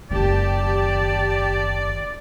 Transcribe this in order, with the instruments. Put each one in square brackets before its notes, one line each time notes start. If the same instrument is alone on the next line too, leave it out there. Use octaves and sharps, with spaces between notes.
[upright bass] F#1 D#3 [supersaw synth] G4 A5 [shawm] D5